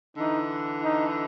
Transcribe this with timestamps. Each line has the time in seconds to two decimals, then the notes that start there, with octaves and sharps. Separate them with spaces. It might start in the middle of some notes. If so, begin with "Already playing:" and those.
0.17 D3 E3 D#4
0.83 D#4